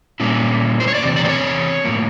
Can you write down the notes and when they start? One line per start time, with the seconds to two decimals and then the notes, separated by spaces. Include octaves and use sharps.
0.20 A#2 G3 A#3 C#4 E4
0.80 C5
0.88 C#5
0.95 D5
1.02 E2 C3
1.16 D5
1.25 C5
1.29 C#5
1.84 A2 F3 A#3